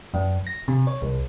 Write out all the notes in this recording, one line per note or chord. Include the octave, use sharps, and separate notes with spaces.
F#2
A#6
C3
C#5
C2